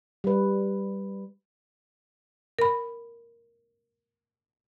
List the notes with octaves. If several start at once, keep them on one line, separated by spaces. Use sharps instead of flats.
G3 B4
A#4 B5